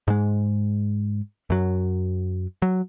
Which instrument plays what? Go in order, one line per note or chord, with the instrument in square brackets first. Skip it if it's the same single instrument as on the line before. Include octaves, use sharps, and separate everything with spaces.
[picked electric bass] G#2 G#3
F#2 F#3
F#3